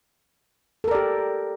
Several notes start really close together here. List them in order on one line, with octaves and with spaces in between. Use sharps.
A4 A#4 D5 G4